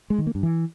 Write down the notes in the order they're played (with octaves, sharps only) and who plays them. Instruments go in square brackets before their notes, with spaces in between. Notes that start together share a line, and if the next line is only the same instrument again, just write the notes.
[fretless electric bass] G#3
D#3
A#3
G2
E3